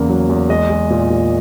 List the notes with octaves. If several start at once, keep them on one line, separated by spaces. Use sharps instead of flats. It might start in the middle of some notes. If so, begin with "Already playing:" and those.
Already playing: E2 C#3 A#3
F#3
E2
G#3 D#5
G#3
A#2
A#2